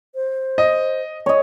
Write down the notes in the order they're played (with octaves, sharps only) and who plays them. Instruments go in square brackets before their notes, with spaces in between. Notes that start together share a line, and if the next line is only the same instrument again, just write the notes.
[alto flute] C5
[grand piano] D#5
[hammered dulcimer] C#5 D#5